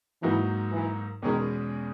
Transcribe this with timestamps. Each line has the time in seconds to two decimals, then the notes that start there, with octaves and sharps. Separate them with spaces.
0.23 G#2 E3 F#3 A#3 D#4 F#4
0.73 E3
1.22 E2 B2 D#3 G#3 C#4 G#4